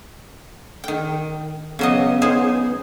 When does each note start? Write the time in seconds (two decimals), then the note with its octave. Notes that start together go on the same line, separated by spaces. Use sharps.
0.84 D#3 G5
1.79 C#3 F#3 B3 D#5
2.22 D#4 G#4 C5